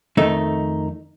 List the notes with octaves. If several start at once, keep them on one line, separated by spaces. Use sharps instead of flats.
F2 D#3 A3 D#4